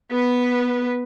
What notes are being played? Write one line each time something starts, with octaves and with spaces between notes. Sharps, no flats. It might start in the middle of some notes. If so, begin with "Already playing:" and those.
B3 B4